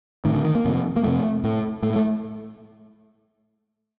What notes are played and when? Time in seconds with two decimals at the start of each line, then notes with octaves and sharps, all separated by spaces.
0.25 A2 D#3
0.35 D3
0.45 D#3
0.55 A#3
0.65 F2 C3
0.96 A#3
1.04 F2 C3 A3
1.44 A2
1.83 A2 A3
1.96 A3